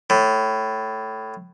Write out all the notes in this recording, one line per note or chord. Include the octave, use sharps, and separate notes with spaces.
A2